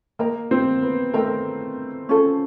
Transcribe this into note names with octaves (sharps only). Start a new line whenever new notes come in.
A#3 A#4 D#5 G5 A#5
C4
B3
A3 A#4 D#5 G5 A#5
C#4 F4 A4